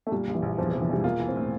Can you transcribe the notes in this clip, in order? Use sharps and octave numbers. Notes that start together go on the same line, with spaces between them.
A3
A#2 G3
A#1
E3
A#1
E2 F3
C3 F3
E3
E1 G3
A#3 F4
E3
C4
A2